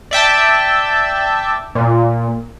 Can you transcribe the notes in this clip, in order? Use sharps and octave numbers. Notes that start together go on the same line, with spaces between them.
D5 E5 G5 A5
A#2